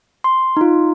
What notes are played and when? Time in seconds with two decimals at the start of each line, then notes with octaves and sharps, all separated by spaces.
0.24 C6
0.57 D#4 F4